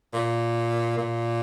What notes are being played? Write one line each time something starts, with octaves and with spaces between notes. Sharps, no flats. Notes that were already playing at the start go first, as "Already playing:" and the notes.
A#2
A#2